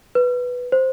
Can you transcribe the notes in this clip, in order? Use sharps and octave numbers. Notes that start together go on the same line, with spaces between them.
B4
C5